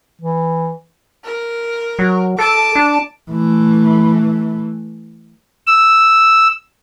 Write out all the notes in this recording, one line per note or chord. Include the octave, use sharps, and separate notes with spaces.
E3
A#4
F#3
A4 A5 D6
D4
E3 A3
E6